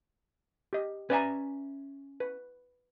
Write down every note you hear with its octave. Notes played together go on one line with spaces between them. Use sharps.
G4 D#5
C#4 B4 D5 E5 G#5 A#5
B4